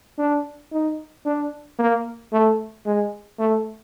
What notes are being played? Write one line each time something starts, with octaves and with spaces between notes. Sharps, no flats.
D4
D#4
D4
A#3
A3
G#3
A3